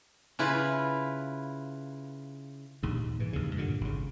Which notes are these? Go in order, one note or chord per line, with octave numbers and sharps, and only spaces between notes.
C#3 E4 F4 B4
A#1 D#2 G#2
G#2 E3
D#2 C#3
G2 A#2 D3
G#1 C#3